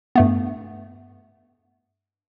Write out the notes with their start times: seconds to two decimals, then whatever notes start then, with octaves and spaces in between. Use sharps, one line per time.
0.15 G2 A3 B3